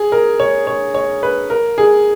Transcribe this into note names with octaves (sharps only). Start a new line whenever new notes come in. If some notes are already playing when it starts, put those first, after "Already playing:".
Already playing: G#4
A#4
C#5
C#5
C#5
B4
A#4
G#4